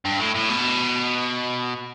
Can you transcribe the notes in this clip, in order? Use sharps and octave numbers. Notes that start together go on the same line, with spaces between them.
G2
A2
A2
B2